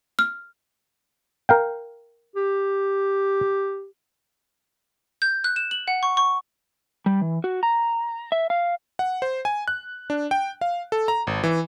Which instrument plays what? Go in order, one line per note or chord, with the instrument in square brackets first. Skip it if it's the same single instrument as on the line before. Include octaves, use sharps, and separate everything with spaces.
[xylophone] F6
[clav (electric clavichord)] A#4 F5 G5
[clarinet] G4
[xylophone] G6
F#6
E7
F#7
F#5
C#6
C#6
[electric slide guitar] G3
E3
F#4
A#5
E5
F5
[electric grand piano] F#5
C5
G#5
F#6
D4
G5
F5
A4
A#5
G#1
E3